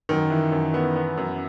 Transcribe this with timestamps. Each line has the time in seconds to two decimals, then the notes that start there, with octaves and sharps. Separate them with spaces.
0.09 F#2 D#3
0.30 E3
0.52 F#2
0.74 B3
0.96 B3
1.18 F#2